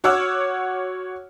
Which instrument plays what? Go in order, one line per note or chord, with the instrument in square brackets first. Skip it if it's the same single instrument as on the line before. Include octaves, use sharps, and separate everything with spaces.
[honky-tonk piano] F#4 C#5 F#5 D6 E6 F6